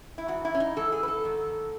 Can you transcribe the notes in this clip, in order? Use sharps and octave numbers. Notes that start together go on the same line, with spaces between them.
E4
G#2 E3 F#4
E4
C#4
D#4
G#2 E3 A4
G#4
B4
A4
G#2 D#3